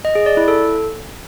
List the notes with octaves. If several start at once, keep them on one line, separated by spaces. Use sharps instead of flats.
D#5
G#4
D5
E4
A4